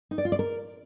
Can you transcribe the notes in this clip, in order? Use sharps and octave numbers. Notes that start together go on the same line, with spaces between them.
D#4
D5
F4
D5
A#4